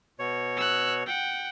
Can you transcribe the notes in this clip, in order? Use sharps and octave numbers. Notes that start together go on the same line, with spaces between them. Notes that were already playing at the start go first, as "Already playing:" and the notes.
B2 C#5
E6 F#6
F#5 G5